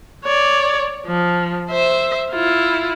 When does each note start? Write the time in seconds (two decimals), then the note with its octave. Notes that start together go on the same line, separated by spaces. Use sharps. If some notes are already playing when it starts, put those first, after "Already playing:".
0.25 C#5 D5
1.07 F3
1.70 C5 E5
2.31 E4 F4